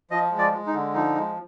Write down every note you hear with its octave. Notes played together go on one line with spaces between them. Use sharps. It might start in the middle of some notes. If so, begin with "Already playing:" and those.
F3 D#5
G#3
D5
G#3
D#4
D3
F3 D#4
G#3